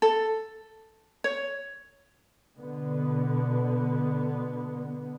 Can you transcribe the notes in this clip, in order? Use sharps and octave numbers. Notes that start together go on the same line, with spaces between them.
A4
C#5
B2 D3 B3